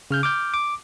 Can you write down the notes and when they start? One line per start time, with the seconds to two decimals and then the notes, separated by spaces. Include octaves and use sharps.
0.11 C#3 F6 G6
0.23 D6 F6 G6
0.54 D6